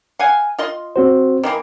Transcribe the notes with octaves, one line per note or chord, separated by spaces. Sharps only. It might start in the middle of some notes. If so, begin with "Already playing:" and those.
F5 F#5 G#5
F4 D#5 C6
C4 F#4 C5
D#3 E3 A#3